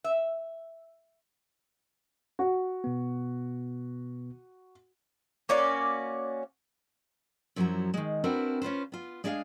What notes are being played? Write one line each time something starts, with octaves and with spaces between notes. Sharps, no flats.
E5
F#4
B2 B3
A#3 C#4 F#4 D5
F#2 F3 F#3 E4 F#4 A#5
D#3 G#3
C4 D4 E4 F#4 A#4 B4
C#4 F4 B4 C5
B3 F4
G#3 D4 G#4 E5 F5